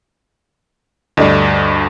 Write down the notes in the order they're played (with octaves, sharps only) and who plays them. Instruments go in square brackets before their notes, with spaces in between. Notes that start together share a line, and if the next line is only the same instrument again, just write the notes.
[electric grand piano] D2 G2 [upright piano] D4 A4 D#5